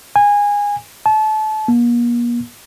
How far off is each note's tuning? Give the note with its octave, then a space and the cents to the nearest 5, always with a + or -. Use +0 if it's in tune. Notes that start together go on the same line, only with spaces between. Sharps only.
G#5 -20
A5 -30
A#3 +40